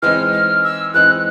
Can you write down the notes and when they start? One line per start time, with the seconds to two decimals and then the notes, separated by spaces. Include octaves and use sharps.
0.02 E3 G#3 C4 D#4 F6
0.33 F6
0.64 E6
0.94 E3 G#3 C4 D#4 F#6